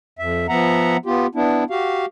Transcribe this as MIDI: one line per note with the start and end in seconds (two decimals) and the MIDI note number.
0.19 0.47 41
0.19 0.47 76
0.49 0.97 53
0.49 0.97 59
0.49 0.97 76
0.49 0.97 78
0.49 0.97 82
1.06 1.27 59
1.06 1.27 65
1.06 1.27 67
1.35 1.64 59
1.35 1.64 62
1.35 1.64 64
1.70 2.06 66
1.70 2.06 67
1.70 2.06 77